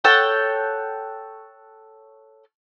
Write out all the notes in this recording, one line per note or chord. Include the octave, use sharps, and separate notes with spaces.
A4 C#5 F#5 G5